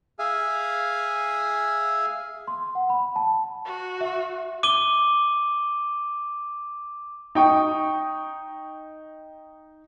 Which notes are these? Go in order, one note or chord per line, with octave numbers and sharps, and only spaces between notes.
G#4 E5 F5 G#5
C6
F#5
B5
A5
F#4
E5
D6 D#7 G7
D#4 G5 C#6 D#6